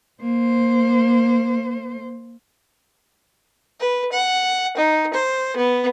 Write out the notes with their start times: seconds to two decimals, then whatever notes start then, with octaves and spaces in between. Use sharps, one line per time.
0.21 A#3 C5
3.80 B4
4.12 F#5
4.77 D#4
5.14 C5
5.57 B3